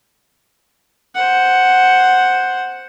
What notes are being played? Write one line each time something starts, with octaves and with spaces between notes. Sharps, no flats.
C5 F#5